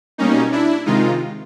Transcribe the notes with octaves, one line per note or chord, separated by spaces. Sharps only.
B2 G3 A#3 C#4 D#4
D4 E4
C3 D#3 G#3 D#4 F4